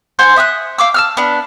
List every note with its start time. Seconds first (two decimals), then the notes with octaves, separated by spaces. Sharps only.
0.19 C5 F#5 G#5 C6
0.36 E5 D#6 E6 F#6
0.78 F5 D6 E6
0.94 A5 E6 F6
1.17 B3 D4